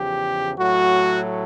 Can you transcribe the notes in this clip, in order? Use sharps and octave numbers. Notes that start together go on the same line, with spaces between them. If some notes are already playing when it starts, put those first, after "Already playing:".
Already playing: E2 C#3 F3 G4
A2 F#3 A3 F#4